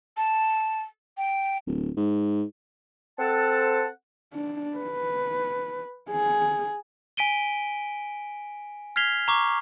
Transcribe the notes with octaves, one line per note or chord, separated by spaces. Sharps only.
A5
G5
D1
G#2
C4 A4 F#5 A5
D4
B4
G#4
G#5 B6 D7 D#7 G7
F6 G#6 B6 C7 F7 G7
A#5 C#6 D6